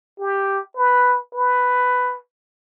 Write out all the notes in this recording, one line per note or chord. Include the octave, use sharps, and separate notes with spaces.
G4
B4
B4